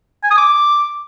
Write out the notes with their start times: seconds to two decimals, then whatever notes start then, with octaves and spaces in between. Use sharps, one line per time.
0.23 G#5
0.30 D#6
0.38 D6